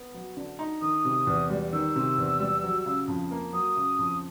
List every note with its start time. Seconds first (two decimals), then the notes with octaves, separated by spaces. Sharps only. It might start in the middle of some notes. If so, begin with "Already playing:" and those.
Already playing: B3
0.14 F#3
0.37 D3
0.59 D#4
0.81 D#3 D#6
1.05 C3
1.27 E2
1.50 G3
1.73 D#3 E6
1.96 C3
2.18 E2
2.40 G3
2.63 F#3
2.86 C#3
3.08 F2
3.31 A#3
3.53 F#3 D#6
3.76 C#3
3.99 F2